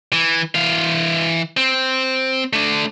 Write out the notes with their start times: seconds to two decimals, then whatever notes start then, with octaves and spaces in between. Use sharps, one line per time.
0.13 E3
0.55 E3 F5
1.57 C4
2.53 A3 D4